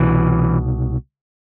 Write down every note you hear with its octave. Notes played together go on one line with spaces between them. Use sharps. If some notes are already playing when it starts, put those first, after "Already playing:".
Already playing: C2 B2 E3